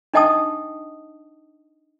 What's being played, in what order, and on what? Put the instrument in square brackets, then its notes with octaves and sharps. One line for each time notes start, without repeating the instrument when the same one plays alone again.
[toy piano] D4 D#4 D#5 G5 A5 D#6